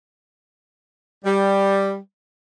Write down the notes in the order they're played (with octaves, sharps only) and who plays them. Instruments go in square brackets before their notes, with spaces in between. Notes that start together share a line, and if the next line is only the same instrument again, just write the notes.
[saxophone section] G3